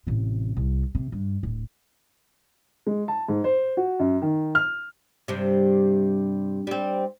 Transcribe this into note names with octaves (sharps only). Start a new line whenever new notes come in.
A1 C3
C2
C3
G2
D1
G#3
A5
G#2
C5
F#4
F#2
D#3
F6
G2 C3
G3 C4